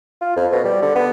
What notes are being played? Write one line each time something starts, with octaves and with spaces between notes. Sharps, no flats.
F4
F2
B2
G3
D3
B3